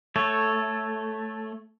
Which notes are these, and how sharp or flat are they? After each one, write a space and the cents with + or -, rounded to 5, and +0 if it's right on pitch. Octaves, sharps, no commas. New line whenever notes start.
A3 +0 A4 -5 C#5 +0